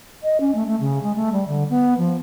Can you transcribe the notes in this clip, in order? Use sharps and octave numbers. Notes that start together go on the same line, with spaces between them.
D#5
C#4
A3
A3
C#3
G#3
A3
G3
D3
B3
F3